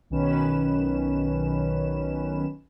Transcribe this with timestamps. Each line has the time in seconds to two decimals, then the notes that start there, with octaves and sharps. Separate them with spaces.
0.10 B1 D#3 C#4 B4 E7